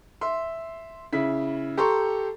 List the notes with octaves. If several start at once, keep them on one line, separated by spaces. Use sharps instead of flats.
E5 C6
C#3 E4 B6
G4 A4 A#5 C6 C#6